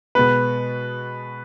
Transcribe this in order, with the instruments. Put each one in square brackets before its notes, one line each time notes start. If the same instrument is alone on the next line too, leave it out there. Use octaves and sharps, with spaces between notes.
[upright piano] B2 G#3 B3 [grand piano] B4